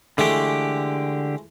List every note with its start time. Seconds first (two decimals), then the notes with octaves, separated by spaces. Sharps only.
0.18 D3 E3 G#3 A3 G4